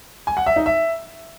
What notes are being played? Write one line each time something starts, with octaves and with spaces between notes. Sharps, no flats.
G#5
F#5
E5
D#4
E5